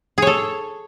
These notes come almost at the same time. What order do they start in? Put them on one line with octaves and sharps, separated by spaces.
G#4 C#5 A4